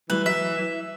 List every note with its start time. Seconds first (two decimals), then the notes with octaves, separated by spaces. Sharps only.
0.10 E3 F#3 G3 A3 B4
0.26 F#3 E5